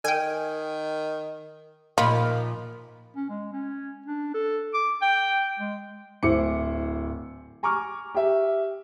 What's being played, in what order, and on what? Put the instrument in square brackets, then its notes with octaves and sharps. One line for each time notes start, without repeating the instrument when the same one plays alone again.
[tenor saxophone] D#3 [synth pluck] G5 G#5
[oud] A#2 F3 [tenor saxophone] D#3 [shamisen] F4 [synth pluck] B5
[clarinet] C#4
G#3
C#4
D4
A4
D6
G5
G#3
[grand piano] D1 E4 C5 D6 C#7
G#5 A#5 C#6 D6 F6
G4 E5